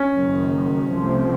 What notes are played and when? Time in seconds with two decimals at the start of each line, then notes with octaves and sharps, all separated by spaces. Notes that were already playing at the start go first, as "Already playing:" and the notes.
Already playing: C#4
0.13 F#1 F#2 D#3
0.92 C2 C3 F3 A3 C4